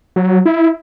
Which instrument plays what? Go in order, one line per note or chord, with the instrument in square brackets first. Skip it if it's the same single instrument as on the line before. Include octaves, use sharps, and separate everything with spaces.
[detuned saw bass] F#3
E4